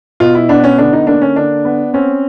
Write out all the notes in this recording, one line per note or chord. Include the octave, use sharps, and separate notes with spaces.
B2 F4
E4
B3 D4
C#4
D3 D4
D#4
A#3 D4
C#4
D3 D4
B3
C4 C#4